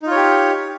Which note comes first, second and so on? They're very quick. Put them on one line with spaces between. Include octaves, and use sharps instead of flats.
D#4 F4 C#5 G4